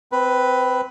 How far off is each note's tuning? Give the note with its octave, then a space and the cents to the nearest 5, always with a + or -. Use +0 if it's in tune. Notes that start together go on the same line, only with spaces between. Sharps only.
C4 -20 B4 +5